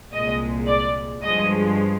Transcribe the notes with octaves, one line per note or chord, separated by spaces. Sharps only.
C2 A#2 G#3 D#5
D5
G2 F3 G#3 D#5